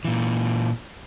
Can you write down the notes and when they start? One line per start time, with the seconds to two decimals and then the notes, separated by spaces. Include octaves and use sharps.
0.05 A#2 E3